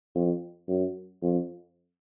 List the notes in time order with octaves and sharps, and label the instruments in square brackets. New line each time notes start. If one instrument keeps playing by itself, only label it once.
[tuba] F2
F#2
F2